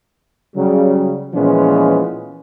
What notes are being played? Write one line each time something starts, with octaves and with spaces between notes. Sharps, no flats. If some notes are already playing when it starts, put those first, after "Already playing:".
C#3 F#3 G3
A#2 E3 F3 G#3 B3 C#4